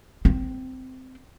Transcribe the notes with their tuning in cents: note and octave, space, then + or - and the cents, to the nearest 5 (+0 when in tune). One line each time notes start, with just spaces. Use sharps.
C4 -20